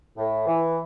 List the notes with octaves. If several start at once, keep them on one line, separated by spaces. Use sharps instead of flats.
A2
E3